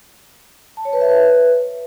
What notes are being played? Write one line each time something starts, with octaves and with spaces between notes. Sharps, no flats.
A5
C#5
B4
E5
B4